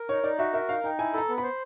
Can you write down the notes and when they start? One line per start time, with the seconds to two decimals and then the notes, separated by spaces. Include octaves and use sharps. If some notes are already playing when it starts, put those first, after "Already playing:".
Already playing: A#4
0.09 D#4 C#5
0.23 D#4 D5
0.39 F#4 E5
0.53 A#4 E5
0.68 D#4 F5
0.84 D#4 G5
0.99 E4 G#5
1.13 A4 B5
1.18 A#5
1.29 B3
1.38 C5 B5